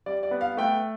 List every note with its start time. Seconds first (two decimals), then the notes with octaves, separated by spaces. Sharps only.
0.06 G3 D5
0.23 D5
0.31 B3
0.41 F5
0.57 A3 G5